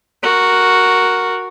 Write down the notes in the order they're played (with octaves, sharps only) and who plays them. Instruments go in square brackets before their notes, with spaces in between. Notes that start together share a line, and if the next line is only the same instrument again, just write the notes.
[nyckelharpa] F#4 A#4